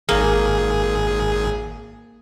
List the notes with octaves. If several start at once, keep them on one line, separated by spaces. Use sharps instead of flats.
G#1 A#3 G#4